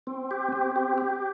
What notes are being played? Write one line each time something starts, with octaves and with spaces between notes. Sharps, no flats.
C4
G4
C4
G4
G4